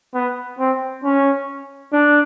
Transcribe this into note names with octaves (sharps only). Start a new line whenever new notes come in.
B3
C4
C#4
D4